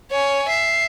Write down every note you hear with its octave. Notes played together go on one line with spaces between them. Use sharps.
C#5 G#5
E5 C7